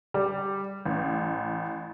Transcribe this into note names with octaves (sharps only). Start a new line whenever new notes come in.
G3
A1